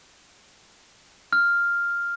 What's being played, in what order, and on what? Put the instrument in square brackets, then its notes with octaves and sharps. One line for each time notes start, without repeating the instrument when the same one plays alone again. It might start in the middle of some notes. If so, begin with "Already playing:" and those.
[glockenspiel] F6